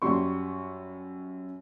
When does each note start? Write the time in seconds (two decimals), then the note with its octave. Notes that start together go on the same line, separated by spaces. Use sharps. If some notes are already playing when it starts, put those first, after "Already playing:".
0.02 F#2 G3 C6 C#6